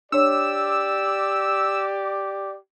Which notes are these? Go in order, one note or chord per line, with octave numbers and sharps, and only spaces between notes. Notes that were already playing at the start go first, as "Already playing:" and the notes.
D4 G4 C#5 D5 E6